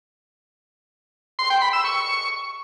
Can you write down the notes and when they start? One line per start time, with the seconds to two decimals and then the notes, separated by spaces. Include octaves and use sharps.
1.39 C6
1.50 G5
1.62 B5
1.73 E6
1.84 C#6